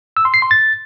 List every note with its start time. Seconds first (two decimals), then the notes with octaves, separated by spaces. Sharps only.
0.17 E6
0.25 C6
0.34 C7
0.42 C6
0.51 A6